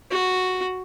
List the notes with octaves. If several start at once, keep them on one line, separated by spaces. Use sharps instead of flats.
F#4